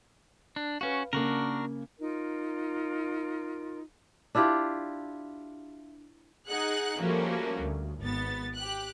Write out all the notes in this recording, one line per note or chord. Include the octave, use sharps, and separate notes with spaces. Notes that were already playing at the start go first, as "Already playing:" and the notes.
D4
C#4 F#4 B4 F5
C#3 A#3 D4 F#4 A#4
D#4 F4 A#4
D4 E4 F4 G4
D#4 G#4 F#5 F#6
F3 G3 A3 A#3 C#4 F#4
D2
G#1 B3 A6
G4 F#6